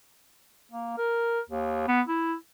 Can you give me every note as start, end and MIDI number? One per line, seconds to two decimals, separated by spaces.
0.71 0.97 58
0.98 1.40 70
1.49 1.86 39
1.88 2.01 59
2.08 2.35 64